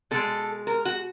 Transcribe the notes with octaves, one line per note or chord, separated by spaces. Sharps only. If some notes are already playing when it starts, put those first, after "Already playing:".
B2 G#3 A4
A#4
F#4